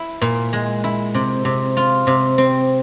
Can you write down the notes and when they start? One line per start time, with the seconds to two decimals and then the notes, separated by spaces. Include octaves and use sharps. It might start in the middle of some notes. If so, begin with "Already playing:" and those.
Already playing: E4
0.21 A#2
0.53 G#3
0.84 E4
1.14 C3
1.45 C3
1.77 F4
2.07 C3
2.38 C4